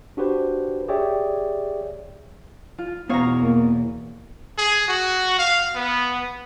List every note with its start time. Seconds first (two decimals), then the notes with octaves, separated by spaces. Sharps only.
0.17 D4 F#4 G4 B4 C5
0.88 G4 G#4 C#5 D5 E5 G5
2.78 F4
3.09 E2 B2 B3 F#4 C#5 F5 A#5
3.42 A#3
4.58 G#4
4.88 F#4
5.38 F5
5.75 B3